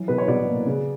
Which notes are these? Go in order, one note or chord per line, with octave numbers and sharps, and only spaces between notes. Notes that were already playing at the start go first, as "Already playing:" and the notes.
Already playing: E3 F#3
B2 B4
C#5
B2 D5
A#3
C#3